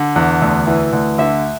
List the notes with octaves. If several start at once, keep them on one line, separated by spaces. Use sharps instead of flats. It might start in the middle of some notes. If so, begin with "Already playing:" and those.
Already playing: D3
E2
D2
E3
D2
D3 E5